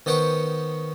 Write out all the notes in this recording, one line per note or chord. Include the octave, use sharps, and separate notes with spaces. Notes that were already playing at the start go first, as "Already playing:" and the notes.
D#3 B3 C5 F#5 G5 C#6